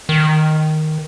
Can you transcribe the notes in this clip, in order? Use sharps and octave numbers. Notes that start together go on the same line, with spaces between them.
D#3